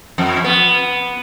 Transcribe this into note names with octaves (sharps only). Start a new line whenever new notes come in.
F2
B3